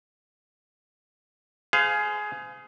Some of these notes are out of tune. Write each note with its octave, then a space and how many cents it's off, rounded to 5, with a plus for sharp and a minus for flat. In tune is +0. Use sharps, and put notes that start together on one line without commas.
G#4 +15 C5 -40 F5 +0